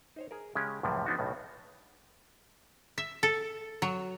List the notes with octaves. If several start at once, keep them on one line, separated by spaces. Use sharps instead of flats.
D#4 C5 C#5
G#4 A#4
C#3 G#3 C#4 G4
C#2 F#2 A2 C3 F3
F3 B3 D4 D#4 F#4
B1 A2 C#3
E5
A4
F#3